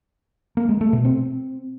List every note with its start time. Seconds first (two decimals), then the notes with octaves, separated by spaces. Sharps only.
0.57 A#3
0.69 G#3
0.81 A3
0.93 B2
1.05 C4